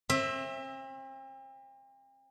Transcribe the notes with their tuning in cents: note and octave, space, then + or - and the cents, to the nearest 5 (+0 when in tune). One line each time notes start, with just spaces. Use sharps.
C4 +40 E5 +0